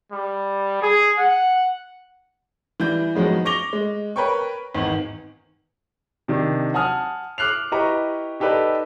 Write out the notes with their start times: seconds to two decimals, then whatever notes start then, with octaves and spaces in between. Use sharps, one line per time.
0.12 G3
0.82 G#4
1.18 F#5
2.80 E3 G3 G6
3.15 D#3 F3 F#3 G#3 B3
3.45 C#6 D6 A#6 F7 G7
3.73 G#3
4.16 A#4 B4 C#5 G5 C#6
4.75 G#1 E2 D#3
6.28 C3 D#3 D4
6.74 F#5 G#5 A5 D#6 F6
7.38 D6 F6 F#6 C7 F7
7.72 E4 G4 B4 D#5 A#5 C#6
8.40 D#4 G4 A4 B4 D5 D#5